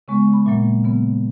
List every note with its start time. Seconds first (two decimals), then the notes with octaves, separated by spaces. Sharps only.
0.08 C#3 G#3 B3 C#6
0.33 B5
0.46 A#2 F#3 A#3 E5
0.84 C#3 F#3 B3